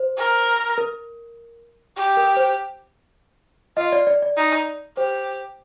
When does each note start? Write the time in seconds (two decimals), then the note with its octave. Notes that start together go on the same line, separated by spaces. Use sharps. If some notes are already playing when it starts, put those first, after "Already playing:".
Already playing: C5
0.17 A#4
0.78 A#4
1.97 G4
2.17 A#4
2.37 C5
3.77 F4 D#5
3.92 D5
4.07 D5
4.22 D5
4.37 D#4
4.97 G4 C5